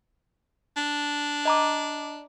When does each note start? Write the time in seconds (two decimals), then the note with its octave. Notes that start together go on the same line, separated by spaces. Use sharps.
0.77 D4
1.45 D#5 A#5 D6